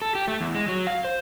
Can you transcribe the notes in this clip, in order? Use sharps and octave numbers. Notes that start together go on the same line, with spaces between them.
A4
G4
A3
E2
G#3
F#3
F5
C5